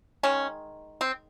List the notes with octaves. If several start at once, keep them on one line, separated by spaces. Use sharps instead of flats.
D#3 G#3 C#4
C4